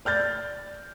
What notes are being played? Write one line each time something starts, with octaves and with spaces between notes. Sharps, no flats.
D5 F6 G6 A6